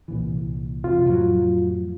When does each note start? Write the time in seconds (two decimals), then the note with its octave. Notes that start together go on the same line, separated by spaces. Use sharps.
0.08 C2 A#2 E3
0.84 F2 C3 F4
1.05 F2 A2 F#3